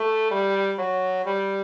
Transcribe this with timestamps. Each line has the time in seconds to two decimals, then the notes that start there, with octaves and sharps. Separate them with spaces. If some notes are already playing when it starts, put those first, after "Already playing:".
Already playing: A3
0.31 G3
0.79 F#3
1.25 G3